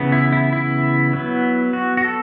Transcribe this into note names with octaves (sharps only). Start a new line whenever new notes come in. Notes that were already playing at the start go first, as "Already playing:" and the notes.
Already playing: C#3 E3 B3
E4
E4
E4
F#3 B3
F#4
F#4
A4